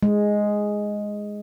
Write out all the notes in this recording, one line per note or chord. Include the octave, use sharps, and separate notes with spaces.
G#3